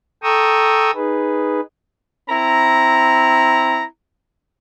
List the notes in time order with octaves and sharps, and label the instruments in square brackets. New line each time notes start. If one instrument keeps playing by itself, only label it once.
[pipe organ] A4 G5 A#5 C#6 D#6 E6
D#4 G#4 B4
[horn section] C4 E4 A#5